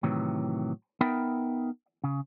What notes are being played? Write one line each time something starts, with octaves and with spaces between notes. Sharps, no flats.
A2 C3 D#3 E3 F#3
B3 D#4 A#4 E5 G5 B5
C#3